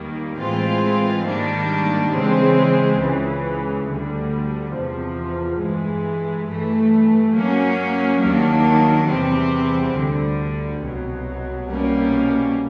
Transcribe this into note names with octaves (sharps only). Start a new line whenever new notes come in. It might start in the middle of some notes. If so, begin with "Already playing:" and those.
Already playing: D#2 D#3 G3 A#3
A2 E3 G#3 C4 F4
G#2 D#3 G3 A#3 D4
C#3 E3 G#3 C4
C#2 C#3 E3
D2 D3 G3
E2 C3 F3
G2 E3 G#3
G2 E3 A3
F#3 A#3 C#4
D#2 D#3 F#3 A#3 D4
E2 C3 E3 G3 C4
D2 D3 G3
C2 B2 F#3
C2 B2 G3 A#3 C#4